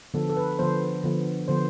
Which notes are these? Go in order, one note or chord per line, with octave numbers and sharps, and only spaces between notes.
D3 F3 B3 A4
A4
B4
D3 F3 B3 C5
D3 F3 B3
D3 F3 B3 C5